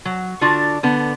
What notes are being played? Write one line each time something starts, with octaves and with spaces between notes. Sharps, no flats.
F#3
D3 D4 F4 F#4
D3 B3